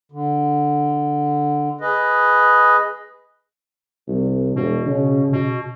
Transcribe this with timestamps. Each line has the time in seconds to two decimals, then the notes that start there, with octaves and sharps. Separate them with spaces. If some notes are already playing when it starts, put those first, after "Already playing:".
0.12 D3
1.81 G#4 B4 D#5
4.08 C2
4.56 E1 B2
4.86 C#3
5.32 B2